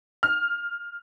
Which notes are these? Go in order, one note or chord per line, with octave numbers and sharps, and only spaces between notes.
F6